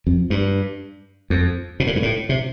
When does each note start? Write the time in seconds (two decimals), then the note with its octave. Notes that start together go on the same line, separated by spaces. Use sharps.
0.07 F2
0.30 G2
1.30 F2
1.80 B2
1.87 A2
1.95 G2
2.03 A2
2.29 C3